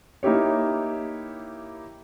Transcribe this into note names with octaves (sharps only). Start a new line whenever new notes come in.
A#3 D#4 E4 G4 C#5